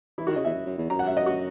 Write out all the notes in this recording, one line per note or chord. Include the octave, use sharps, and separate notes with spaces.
E3 E4
D#3 F#4
C#3 D#5
E2 E5
F#2
F#2
E2
F#2 A#5
F#5
E5
D#5
F#4